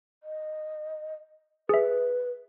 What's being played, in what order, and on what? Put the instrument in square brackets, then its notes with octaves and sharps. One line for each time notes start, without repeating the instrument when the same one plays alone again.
[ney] D#5
[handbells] G#4 E5 [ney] B4